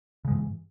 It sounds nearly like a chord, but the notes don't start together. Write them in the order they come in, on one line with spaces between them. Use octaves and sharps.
C#3 G#3 G2 E3